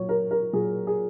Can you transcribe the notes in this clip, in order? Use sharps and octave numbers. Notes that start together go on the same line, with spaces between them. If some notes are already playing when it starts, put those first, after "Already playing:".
Already playing: A#2 F#3 C#5
A#4
A#4
A#2 F#3 G#4
G#4